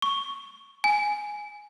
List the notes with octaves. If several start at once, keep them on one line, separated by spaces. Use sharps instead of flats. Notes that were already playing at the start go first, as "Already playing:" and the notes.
C#6
G#5